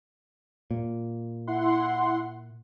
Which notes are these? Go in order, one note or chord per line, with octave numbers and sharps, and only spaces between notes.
A#2
E4 F#5 C6